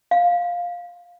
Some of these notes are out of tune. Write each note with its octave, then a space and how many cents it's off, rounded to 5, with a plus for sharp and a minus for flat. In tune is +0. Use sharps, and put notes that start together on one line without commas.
F5 +10